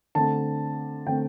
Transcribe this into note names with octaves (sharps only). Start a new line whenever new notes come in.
D3 A3 C4 A5
D3 A3 C4 G5